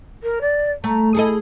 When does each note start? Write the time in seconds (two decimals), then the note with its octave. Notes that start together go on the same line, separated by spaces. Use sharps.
0.23 A#4
0.41 D5
0.84 A3 A#5
1.15 E4 G#4 A4 D#5